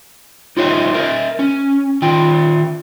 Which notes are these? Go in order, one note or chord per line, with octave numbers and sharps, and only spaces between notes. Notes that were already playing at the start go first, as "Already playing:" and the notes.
D#4 F4 G4 C#5 D#5 E5
A#4 D#5 E5
C#4
D#3 F4 G5